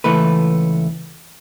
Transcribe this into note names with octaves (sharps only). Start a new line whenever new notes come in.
C#2 E3 A3 B4